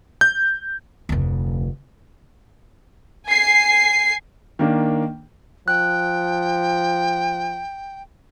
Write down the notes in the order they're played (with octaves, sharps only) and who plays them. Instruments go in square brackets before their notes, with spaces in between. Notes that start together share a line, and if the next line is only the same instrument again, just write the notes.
[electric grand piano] G6
[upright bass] F1 D2
[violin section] G#5 C7
[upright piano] D#3 A#3 D4
[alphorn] F3 [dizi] G5 [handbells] F#6